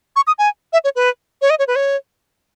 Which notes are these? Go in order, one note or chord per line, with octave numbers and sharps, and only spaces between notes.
C#6
D#6
G#5
E5
C#5
B4
C#5
D#5
C#5
B4
C#5